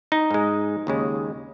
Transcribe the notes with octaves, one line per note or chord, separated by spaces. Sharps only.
D#4
G#2 G#3
D#2 C#3 G#3